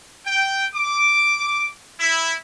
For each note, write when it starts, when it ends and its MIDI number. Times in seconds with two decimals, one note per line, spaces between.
0.24 0.63 79
0.73 1.67 86
1.99 2.33 64